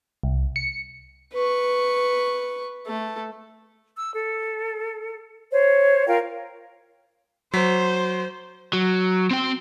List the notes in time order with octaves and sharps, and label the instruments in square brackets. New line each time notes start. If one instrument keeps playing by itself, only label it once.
[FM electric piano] C2
C#7
[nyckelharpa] B4 C#6
A3 A4
[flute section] E6
A4
C5 C#5
F4 A#4 F5 G5
[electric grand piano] F#3 B6 [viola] C5
[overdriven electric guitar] F#3
C4 G5